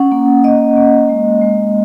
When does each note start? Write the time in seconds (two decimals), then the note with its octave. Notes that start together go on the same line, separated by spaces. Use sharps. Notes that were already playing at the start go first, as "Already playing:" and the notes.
Already playing: C#4 F#5
0.12 A#3
0.44 A#3 D#5
0.77 A#3
1.09 G#3
1.41 G#3